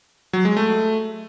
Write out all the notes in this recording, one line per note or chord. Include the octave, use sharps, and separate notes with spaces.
F#3
G#3
A3